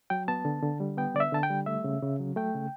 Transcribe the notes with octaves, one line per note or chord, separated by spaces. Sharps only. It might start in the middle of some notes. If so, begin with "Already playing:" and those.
F#3 G5
B3 A5
D3
D3
G3
B3 G5
D3 D5
E5
D3 A5
G5
G3
A3 E5
C#3
C#3
F#3
A3 G5
C#3